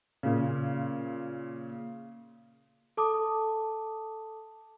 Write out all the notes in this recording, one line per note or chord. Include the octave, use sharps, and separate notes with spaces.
A#2 C#3
A4 A5 D6 D#6